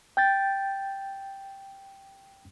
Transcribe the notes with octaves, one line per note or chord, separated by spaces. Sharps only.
G5 G6 A6